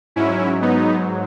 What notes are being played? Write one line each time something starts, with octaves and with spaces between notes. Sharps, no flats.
G#2 F#3 C#4 E4
B3 D#4